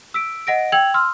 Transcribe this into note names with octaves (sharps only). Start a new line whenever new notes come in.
E6 B6 D7
D#5 F#5 A#6 D7
G5 E6 G#6 F7 F#7
C6 E6 F6